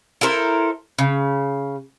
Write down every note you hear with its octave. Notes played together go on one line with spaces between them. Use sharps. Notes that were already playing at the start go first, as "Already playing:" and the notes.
E4 A4 A#4 C5
C#3